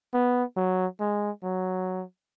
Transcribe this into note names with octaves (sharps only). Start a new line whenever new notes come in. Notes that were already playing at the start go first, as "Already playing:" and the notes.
B3
F#3
G#3
F#3